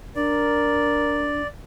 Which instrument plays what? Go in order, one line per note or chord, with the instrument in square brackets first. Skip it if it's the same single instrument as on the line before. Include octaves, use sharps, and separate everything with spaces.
[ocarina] D4 [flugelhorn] A#4 [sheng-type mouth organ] D5